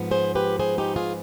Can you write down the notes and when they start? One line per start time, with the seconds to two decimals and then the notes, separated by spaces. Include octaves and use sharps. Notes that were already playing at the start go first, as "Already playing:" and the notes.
Already playing: G#2 F3 B3
0.11 G#4 C5
0.35 G4 B4
0.59 G#4 C5
0.78 D#4 G4
0.96 F4 G#4